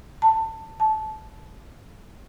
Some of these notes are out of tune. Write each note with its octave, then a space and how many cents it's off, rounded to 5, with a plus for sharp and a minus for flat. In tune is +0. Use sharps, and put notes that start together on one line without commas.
A5 +15
A5 -20